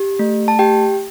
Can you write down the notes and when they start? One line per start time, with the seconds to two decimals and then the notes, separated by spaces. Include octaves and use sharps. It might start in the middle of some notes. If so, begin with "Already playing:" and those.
Already playing: G4
0.19 A3
0.48 A5
0.59 G4 G5